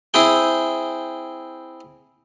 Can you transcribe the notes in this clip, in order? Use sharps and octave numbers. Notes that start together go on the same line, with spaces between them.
C4 E4 G#4 G5